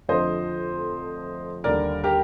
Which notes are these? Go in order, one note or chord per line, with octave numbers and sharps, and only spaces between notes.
F2 D3 F3 A3 C5 D#5
D#2 D3 G3 A#4 D5
G4 A#4